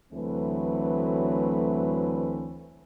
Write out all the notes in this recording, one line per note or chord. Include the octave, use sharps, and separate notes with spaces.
D2 E3 F#3 A3 C4 B4